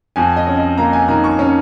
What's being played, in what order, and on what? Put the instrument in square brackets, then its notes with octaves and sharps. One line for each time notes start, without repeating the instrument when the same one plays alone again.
[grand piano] F2 G#5
D#5
C#4
D#5
A#3 A#5
G#5
D#3 A#5
C#6
C#4